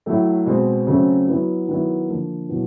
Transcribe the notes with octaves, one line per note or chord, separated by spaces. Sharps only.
A2 F#3 A3
B2 G#3 C4
C#3 F#3 A3 C4
F#3 B3 E4
D#3 F#3 B3 E4
D3 F3 A#3
B2 F#3 B3 E4